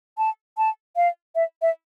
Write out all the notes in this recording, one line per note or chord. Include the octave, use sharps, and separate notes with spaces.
A5
A5
F5
E5
E5